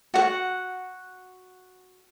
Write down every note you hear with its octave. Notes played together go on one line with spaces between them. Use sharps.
F#4 F#5